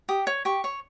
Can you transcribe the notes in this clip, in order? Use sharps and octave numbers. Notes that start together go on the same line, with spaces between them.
G4 D#6
C#5
G4 C#6
C#5